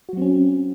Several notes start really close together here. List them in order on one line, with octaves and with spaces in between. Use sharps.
F#4 F#3 C4 C#4